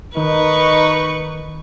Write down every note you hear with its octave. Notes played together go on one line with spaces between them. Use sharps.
D#3 D#4 B4 C#6